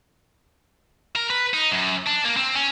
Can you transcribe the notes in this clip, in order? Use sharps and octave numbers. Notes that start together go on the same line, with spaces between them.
A#4
B4
D#4
F#2
D4
A#3
C4
C#4